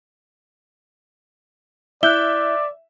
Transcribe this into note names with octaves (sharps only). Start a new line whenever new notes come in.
E4 D5 E5 F#6 G6 G7